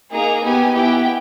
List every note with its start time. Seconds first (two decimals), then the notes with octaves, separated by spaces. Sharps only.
0.12 A#3 D#4 G#4 A#5
0.43 B3 G4 G#5
0.74 B3 E4 G4 G5